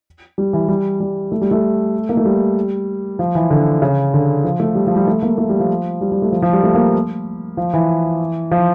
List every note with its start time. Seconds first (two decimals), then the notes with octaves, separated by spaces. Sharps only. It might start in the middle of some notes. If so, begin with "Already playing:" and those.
0.38 G3
0.53 E3
0.68 G3
1.00 G3
1.32 A3
1.41 G3
1.51 A3
2.09 A#3
2.17 A3
2.25 G3
3.19 F3
3.35 E3
3.50 D3
3.82 C#3
4.14 D3
4.44 F3
4.60 A3
4.75 G3
4.87 F3
4.96 G3
5.07 A3
5.22 A#3
5.38 A3
5.49 G3
5.60 F3
6.01 G3
6.12 G3
6.22 A3
6.32 F3
6.42 F3
6.53 G3
6.63 A3
6.74 A#3
7.57 F3
7.73 E3
8.51 F3